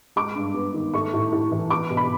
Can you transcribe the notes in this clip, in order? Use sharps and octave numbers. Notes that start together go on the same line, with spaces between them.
G#3 D6
G2
B3
D#3
A3 C#6
A2
A2
E3
B3 D6
B2
B5